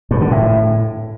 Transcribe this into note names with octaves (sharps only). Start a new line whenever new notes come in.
G2
D3
A2